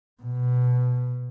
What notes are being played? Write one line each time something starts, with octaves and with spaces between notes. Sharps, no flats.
B2